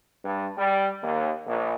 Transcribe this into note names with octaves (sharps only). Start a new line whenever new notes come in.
G2
G3
D#2
A#1